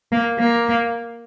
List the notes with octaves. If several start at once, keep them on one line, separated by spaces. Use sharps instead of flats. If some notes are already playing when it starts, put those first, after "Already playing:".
A#3
A#3